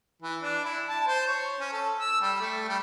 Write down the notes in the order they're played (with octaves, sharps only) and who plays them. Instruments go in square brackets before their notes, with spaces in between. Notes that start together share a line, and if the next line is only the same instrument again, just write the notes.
[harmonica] E3
D4
E4
A5
C5
C#5
C#4
A4
E6
G3
A3
G3